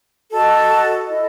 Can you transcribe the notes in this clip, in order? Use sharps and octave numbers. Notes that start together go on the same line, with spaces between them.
F#4 A4 D#5 A5
E4 A4 D#5